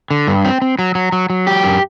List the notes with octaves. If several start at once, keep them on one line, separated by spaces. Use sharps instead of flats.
D3
G2
C4
C4
F#3
F#3
F#3
F#3
G4
F#2